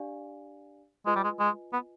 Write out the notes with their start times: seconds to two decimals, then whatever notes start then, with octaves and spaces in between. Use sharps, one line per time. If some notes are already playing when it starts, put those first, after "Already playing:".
Already playing: D4 G4 D5 F5 G#5
1.06 G#3 F4 B4 D#5 G#5
1.15 G3
1.24 G#3
1.40 G#3
1.73 B3